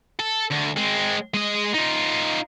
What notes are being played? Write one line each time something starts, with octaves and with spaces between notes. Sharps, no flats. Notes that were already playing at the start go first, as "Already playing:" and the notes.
A4
D2
G#3 C4
G#3 D#5
D#4 F4